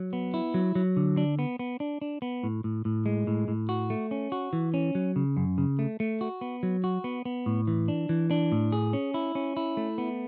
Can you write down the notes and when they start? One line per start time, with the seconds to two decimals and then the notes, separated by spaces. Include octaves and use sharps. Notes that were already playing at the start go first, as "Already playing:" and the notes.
Already playing: F#3
0.13 B3
0.34 E4
0.54 F#3
0.75 F#3
0.96 D3
1.17 D4
1.39 B3
1.59 B3
1.80 D4
2.02 D4
2.22 B3
2.43 A2
2.64 A2
2.85 A2
3.06 G#3
3.27 A2
3.48 A2
3.69 F#4
3.90 A3
4.11 C#4
4.32 F#4
4.53 E3
4.74 C#4
4.95 F#3
5.16 C#3
5.37 F#2
5.58 C#3
5.79 A3
6.00 A3
6.21 F#4
6.41 B3
6.63 F#3
6.84 F#4
7.04 B3
7.25 B3
7.46 A2
7.67 E3
7.88 D4
8.09 E3
8.31 D4
8.52 A2
8.72 G#4
8.93 C#4
9.14 E4
9.35 C#4
9.57 E4
9.77 A3
9.98 B3